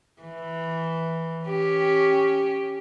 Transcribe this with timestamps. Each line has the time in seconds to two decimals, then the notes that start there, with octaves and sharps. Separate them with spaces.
0.23 E3
1.46 C#4 G4